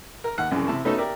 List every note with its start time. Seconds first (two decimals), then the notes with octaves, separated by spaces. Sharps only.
0.24 A#4
0.38 D#2 F#5
0.51 C2 F#2 C#3 E3
0.68 C3 E4 A5
0.85 A3 B3 C#4 D#4 F#4 A4
0.98 G4 A#4 D5 E5